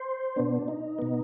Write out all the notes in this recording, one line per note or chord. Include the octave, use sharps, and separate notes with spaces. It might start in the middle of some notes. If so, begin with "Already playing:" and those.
Already playing: C5
B2 B3 D4
D#4
B2 B3